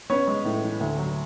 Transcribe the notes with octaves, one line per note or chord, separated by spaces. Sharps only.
B3 C#4 C#5
G#3
A2
E3
D2
F#3